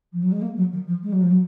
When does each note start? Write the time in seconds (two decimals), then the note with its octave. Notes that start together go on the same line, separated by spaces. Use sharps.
0.12 F3
0.22 F#3
0.31 G#3
0.41 A#3
0.56 F#3
0.72 D#3
0.86 F3
1.03 G#3
1.12 F#3
1.21 F3
1.31 F#3